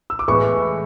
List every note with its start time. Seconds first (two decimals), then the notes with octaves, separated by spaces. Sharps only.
0.10 E6
0.19 D6
0.28 A2 E3 G#3 B3 C#6